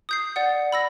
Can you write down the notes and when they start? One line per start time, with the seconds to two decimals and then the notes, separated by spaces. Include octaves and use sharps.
0.09 D#6 G6 C7
0.36 D5 F#5
0.72 B5 E6 A#6